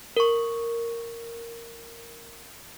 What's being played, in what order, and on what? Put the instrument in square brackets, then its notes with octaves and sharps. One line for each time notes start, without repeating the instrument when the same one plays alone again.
[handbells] A#4 C#6